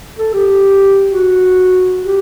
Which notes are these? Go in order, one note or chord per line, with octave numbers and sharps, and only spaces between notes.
A4
G4
F#4
G4